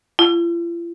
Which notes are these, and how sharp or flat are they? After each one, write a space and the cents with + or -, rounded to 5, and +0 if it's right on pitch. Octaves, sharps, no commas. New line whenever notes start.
F4 -45